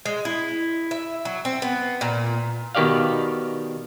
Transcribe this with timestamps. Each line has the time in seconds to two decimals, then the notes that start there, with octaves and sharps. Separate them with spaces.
0.06 G#3
0.25 E4
0.91 E5
1.25 F#3
1.45 C4
1.62 B3
2.01 A#2
2.75 B2 D#3 G4 D5 F5